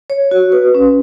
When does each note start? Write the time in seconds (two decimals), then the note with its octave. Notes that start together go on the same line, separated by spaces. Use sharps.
0.10 C#5
0.31 F#4
0.52 B4
0.75 C#4